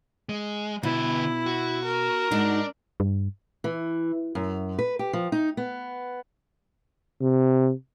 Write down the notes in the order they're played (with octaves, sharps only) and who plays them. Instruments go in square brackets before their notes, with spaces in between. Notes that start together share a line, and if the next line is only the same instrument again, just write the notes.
[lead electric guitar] G#3
[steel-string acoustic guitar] B2 [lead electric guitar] D3 B4 [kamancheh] E4
[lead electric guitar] F#4
[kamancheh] A#4
[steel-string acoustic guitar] G#2 D#4 F#4 [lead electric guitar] D4
[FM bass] G2
[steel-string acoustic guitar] E3
F#2
B4
G4
F3
D#4
B3
[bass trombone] C3